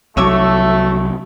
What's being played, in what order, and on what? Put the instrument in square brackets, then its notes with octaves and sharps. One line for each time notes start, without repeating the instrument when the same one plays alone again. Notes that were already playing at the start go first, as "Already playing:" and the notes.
[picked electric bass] C2 F#3 [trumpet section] A3 [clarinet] F#4 [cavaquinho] C#5 E5 D6